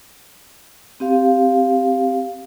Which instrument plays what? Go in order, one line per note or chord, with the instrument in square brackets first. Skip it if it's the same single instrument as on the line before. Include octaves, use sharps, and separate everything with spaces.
[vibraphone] C4 G4 F5